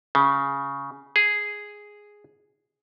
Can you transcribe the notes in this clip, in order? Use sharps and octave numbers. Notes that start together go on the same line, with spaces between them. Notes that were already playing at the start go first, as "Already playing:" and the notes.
C#3
G#4